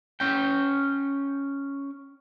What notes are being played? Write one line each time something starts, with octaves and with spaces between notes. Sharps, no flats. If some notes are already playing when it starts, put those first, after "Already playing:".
C#4 G5